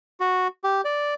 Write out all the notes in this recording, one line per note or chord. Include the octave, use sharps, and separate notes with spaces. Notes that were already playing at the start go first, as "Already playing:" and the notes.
F#4
G4
D5